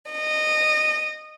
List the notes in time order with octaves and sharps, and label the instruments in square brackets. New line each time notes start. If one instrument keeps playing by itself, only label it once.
[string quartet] D#5